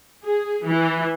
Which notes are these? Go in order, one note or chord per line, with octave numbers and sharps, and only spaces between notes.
G#4
E3